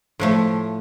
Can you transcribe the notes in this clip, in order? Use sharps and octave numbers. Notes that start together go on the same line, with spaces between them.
A2 F3 A3